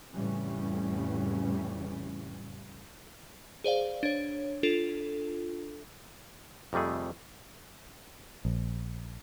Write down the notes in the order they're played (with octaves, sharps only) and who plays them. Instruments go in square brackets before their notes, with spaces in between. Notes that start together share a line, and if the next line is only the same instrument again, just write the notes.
[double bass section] F2 A2 C#3 E3 G3 C#4
[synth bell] G#4 C5 D5 F5
D4 C#5
D4 F4 A4
[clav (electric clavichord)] F2 C3 G3 A3 G#4
[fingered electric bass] A#1